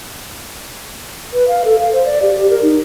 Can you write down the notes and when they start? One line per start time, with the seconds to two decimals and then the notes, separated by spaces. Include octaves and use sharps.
1.33 B4
1.48 F5
1.65 A4
1.78 F5
1.92 C5
2.05 D5
2.22 G4
2.34 G4
2.50 A#4
2.62 D#4